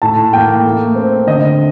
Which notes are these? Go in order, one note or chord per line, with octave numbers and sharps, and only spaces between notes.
A2 A5
A#3 G5
A3
C4
D3 D#5